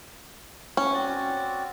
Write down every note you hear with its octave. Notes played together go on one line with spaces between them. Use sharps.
C#4
C4 F#4 D5